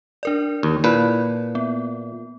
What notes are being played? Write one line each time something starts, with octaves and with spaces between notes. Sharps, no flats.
D4 A#4 D5
D#2
A#2 E4 B4
B3